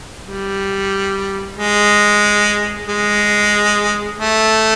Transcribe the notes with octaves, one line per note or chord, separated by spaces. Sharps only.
G3
G#3
G#3
A3